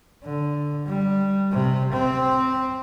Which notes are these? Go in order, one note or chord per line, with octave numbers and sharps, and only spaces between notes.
D3
G3
C3
C4